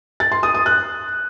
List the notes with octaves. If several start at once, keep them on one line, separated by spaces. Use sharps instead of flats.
A6
C6
D#6
D#6
F#6